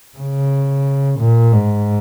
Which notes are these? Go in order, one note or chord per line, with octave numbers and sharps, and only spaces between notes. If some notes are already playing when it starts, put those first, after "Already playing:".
C#3
A#2
G#2